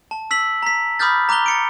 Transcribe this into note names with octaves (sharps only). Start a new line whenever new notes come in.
A5
E6 B6 F#7
A#5 B6
B5 D6 D#6 F6 G6 A6
A#5 D6 F#6 F7 G7
A6 C#7 D7